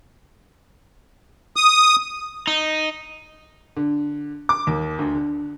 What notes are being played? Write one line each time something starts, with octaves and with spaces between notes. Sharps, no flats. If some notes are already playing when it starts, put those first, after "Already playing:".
D#6
D#4
D3
D6
D#2
D2
D3